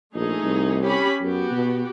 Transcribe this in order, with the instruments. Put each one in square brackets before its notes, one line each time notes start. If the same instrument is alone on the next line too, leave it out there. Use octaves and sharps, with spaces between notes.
[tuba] A#1 [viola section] A3 D#4 G#4
[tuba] C2
[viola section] C#4 G4 B5
[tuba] F#2 [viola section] B3 F#4 G4
[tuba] B2